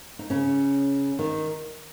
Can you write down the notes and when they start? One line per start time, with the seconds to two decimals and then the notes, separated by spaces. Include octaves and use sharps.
0.19 D#4
0.30 C#3 C#4
1.19 D#3 D#4